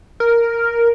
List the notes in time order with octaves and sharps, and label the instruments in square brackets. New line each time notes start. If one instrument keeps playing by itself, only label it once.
[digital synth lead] A#4